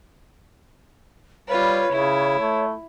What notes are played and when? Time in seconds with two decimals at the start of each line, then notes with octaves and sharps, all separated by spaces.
1.49 G3 F4 B4 C#5
1.91 C#3 E4
2.39 A3